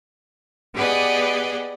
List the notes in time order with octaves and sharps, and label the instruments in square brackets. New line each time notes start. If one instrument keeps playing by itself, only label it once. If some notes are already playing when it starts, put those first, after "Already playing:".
[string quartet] B3 G4 G#4 B4 D5 D#5